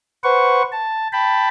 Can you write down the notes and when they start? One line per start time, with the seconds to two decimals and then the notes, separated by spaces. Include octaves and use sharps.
0.24 B4 C5 F#5 C#6
0.72 A5
1.13 G5 A5 B5